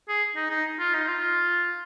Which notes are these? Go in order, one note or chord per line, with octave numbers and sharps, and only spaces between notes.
G#4
D#4
D#4
F4
D#4
F4